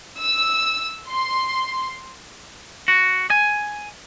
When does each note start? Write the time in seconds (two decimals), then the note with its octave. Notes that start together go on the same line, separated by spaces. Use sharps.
0.21 E6
1.08 C6
2.88 F#4
3.30 G#5